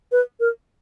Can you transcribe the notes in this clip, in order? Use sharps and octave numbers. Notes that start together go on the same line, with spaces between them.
B4
A#4